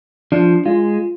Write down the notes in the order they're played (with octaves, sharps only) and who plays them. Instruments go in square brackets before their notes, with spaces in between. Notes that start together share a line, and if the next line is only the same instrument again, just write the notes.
[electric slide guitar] F3 [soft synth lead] D4
[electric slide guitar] G#3 [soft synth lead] F4